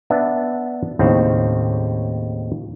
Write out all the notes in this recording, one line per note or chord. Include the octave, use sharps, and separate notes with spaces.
B3 D4 E5
D#2 A2 C#3 C4